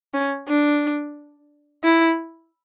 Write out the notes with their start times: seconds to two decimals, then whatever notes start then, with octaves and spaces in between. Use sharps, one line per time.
0.14 C#4
0.49 D4
1.84 E4